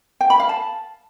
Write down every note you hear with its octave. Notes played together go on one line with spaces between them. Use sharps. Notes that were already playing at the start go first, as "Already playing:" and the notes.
G5
B5
F5
A5